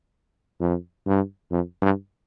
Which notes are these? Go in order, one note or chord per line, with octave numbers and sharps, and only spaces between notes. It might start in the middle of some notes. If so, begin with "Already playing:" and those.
F2
G2
F2
G2